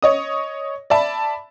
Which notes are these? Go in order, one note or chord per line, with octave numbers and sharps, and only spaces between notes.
C#5 D#5 D#6
D5 E5 A5 B5